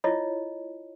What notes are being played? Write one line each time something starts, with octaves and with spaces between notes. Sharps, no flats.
E4 F4 C#5 D#5